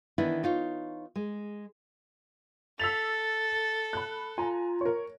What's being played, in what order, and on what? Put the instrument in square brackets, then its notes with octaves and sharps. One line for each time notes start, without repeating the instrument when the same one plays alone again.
[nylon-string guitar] D#3 E3 B3 D4 E4
D#4 F4 C#5
G#3
[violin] A4 [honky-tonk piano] E6 B6 F7 [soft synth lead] A6
[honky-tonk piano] B5 F#6
[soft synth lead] F4 [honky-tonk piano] G#5 A#5
[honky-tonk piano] A#4 C#5